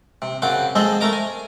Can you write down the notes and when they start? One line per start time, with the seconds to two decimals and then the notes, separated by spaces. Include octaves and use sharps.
0.22 C3
0.42 F#2 C#3 C4 F#5 D6
0.75 G#3 C4 G#4 A4 C5 D#5
1.01 A3 A#4 A#5 D6
1.13 G#5